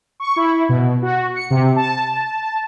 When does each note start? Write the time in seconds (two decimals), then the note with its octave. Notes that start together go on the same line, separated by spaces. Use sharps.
0.20 C#6
0.36 E4
0.69 B2
1.02 F#4
1.35 C#7
1.50 C3
1.76 A5